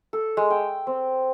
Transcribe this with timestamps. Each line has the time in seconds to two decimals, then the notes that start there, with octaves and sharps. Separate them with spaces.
0.13 A4
0.37 G#3
0.50 G5
0.87 C4